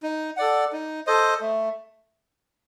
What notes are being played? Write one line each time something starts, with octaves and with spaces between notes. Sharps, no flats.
D#4
A4 D5 F#5
D#4
A4 C5 D#5
A3